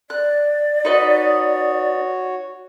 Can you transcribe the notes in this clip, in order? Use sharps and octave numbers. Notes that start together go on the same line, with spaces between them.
D5 F#6
D#4 F#4 B4 C#5 D#5